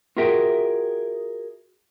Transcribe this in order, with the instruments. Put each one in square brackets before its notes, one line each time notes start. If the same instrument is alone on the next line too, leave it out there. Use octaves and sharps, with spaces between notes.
[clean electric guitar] F4 F#4 G#4 A#4 E5 G5